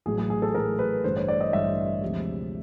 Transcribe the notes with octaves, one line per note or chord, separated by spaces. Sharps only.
A1 A2 F#3 G#4
G#4
G#4
A4
A1 A2 F#3 A#4
B4
A1 G2 D3 C5
C#5
D5
D#5
A1 G2 D3 E5
D2 C3 F3 G#3